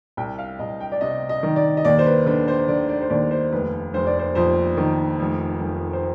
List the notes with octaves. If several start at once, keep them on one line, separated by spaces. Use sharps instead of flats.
C2 G5
F5
C2 D#5
G5
D5
C3 D#5
D#5
D#3
D5
D#5
D#2 D5
C5
B4
D3 B4
C5
D3 D5
D5
C5
D#2 D5
C5
F1 B4
F1 C5
D5
C5
F2 C5
D#3
F1
F1
C5